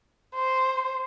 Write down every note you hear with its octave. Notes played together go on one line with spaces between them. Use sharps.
C5